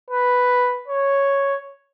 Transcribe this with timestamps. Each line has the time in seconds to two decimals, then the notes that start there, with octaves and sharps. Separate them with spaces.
0.10 B4
0.88 C#5